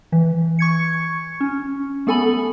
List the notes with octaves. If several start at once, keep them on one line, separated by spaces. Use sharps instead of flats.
E3
C#6 G#6 C#7
C#4
A3 B3 A4 G#5 B5 F#7